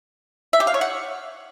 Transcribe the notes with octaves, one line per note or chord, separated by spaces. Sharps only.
E5
G4
F5
C#5
F#5